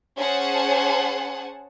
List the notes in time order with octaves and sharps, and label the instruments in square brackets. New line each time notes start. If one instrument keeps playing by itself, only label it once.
[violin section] C#4 G#4 C5 F#5 G#5 A5